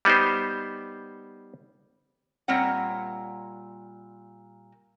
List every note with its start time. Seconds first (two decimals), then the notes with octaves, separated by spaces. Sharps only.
0.05 G3 B3 D#4 G4 C5
2.48 A#2 G3 C4 C#5 F#5